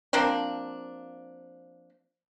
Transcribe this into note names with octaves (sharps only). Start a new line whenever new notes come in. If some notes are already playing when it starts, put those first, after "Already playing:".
F3 A#3 C4 D4